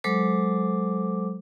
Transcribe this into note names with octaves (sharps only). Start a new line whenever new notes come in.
F#3 G#3 A4 C5 D6